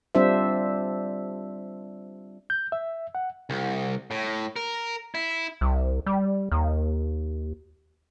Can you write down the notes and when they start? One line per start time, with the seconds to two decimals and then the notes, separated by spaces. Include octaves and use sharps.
0.15 G3 C4 D4 F4 C5 E5
2.50 G6
2.72 E5
3.15 F#5
3.50 C2
4.11 A2
4.56 A#4
5.15 E4
5.61 C2
6.06 G3
6.52 D#2